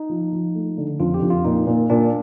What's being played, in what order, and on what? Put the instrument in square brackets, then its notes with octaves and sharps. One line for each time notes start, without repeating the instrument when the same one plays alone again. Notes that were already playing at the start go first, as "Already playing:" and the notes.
Already playing: [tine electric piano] D#4
[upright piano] F3
F3
A3
D3
[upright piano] F2 [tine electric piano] F4
[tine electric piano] G4
[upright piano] F2
[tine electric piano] F4
[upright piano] A#2 [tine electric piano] D#4
[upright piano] A#2
[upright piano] A#2 [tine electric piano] D4